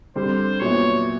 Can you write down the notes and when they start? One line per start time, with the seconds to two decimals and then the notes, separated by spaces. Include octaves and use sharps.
0.16 D3 G3 C4 C5
0.60 A#2 F#3 B3 E4 C#5